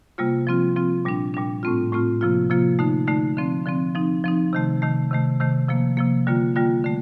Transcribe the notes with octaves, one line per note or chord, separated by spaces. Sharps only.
C3 G3 A#3 F4
F3 C4 F4
F3 C4 F4
A#2 G3 D4
A#2 G3 D4
A2 A3 C4 F4
A2 A3 C4 F4
C3 F3 A#3 F4
C3 F3 A#3 F4
D3 A3 D#4
D3 A3 D#4
D3 F3 C4
D3 F3 C4
F3 C4 D#4
F3 C4 D#4
C3 D#3 A3
C3 D#3 A3
C3 D#3 A3
C3 D#3 A3
C3 F3 A#3
C3 F3 A#3
D3 G3 A#3 F4
D3 G3 A#3 F4
D3 A3